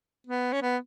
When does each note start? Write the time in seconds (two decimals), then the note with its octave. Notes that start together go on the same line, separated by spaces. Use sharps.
0.27 B3
0.53 C#4
0.62 B3